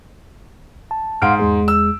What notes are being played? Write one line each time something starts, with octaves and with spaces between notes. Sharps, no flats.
A5
G#2 F5 F#5 C6 F6 D7
E2 G#3 G#4
E6